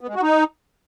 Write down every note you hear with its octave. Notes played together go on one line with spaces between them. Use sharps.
B3
G#3
F#4
D#4